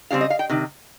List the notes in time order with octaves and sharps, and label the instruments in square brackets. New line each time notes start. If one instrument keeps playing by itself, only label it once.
[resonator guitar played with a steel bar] C#3 G3 C4 F5
D#5
F5
G5
C3 D#3